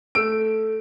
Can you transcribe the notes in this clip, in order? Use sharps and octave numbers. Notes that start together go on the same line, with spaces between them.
A3 E6 D7